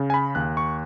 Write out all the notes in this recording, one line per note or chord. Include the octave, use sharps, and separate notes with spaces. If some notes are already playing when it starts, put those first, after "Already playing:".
Already playing: C#3
G#5
B5
D#2 F#6
C#6